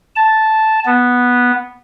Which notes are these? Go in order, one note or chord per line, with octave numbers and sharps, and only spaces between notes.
A5
B3